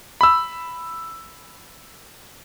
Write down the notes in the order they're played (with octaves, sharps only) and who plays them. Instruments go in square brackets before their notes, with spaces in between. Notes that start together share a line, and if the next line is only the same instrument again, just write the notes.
[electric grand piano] B5 E6